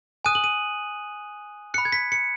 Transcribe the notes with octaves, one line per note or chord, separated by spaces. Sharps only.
G#5 D#6 F#6 D#7
F#7
D#7
B5 F#6 C#7
G#6
B6
C#7